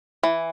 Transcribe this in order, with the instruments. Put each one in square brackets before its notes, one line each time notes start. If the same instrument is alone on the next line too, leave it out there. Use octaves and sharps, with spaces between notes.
[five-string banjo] E3